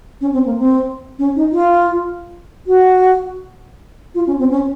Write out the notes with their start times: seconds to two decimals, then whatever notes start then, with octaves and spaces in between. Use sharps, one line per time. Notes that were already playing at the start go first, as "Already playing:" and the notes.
0.21 C#4
0.33 C4
0.46 A#3
0.58 C4
1.19 C#4
1.36 D#4
1.52 F4
2.67 F#4
4.15 F4
4.27 C#4
4.39 C4
4.51 C#4